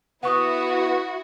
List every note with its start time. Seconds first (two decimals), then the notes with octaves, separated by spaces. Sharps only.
0.23 B3 E4 F#4 B4 F#5 C#6 D#6